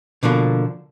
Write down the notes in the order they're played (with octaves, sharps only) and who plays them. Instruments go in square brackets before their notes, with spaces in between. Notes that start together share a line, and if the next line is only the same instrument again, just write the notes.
[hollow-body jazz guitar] B2 D3 F3 A#3